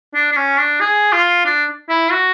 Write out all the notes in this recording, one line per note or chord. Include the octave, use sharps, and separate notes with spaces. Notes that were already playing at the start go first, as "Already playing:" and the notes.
D4
D4
C#4
D4
G#4
F4
D4
E4
F#4